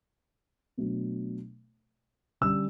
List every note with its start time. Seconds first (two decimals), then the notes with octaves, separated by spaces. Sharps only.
0.78 B2 F#3 A3 D4
2.41 D3 G3 C#4 E6